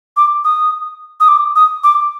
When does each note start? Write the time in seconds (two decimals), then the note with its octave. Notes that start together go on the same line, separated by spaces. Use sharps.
0.17 D6
0.44 D#6
1.20 D#6
1.28 D6
1.56 D#6
1.84 D6